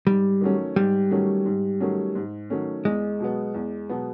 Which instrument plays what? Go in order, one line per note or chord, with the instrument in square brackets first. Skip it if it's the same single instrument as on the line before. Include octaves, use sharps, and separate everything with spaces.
[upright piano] G#2 [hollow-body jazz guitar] G3
[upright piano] D#3 F#3 A3 C#4
[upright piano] G#2 [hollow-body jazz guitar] G3
[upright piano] D#3 F#3 A3 C#4
G#2
D#3 F#3 A3 C#4
G#2
D#3 F#3 A3 C#4
[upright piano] E2 [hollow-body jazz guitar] G#3
[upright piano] B2 F#3 B3
E2
B2 F#3 B3